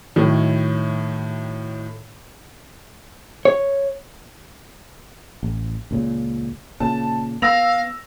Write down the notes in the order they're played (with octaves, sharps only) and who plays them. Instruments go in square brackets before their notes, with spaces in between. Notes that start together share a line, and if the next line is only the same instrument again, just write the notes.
[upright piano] A2 D#3 F#3
[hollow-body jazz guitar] C#5
[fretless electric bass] A1
C#2 A#2 C#3
[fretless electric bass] A#2 C#3 [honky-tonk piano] A5
[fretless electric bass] B3 [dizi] F5 [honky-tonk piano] E6 A#6 F7